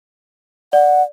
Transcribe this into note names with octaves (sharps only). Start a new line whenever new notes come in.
D5 F#5